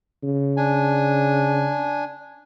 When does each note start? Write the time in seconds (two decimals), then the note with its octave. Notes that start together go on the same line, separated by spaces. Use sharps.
0.23 C#3
0.57 D4 G#5